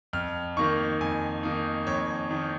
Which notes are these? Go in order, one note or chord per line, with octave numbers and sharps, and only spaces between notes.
F2 F6
D#3 A#3 D#4 C#6
F2 G#5
D#3 A#3 D#4
F2 C#5
D#3 A#3 D#4